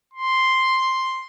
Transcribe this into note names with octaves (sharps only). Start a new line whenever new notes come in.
C6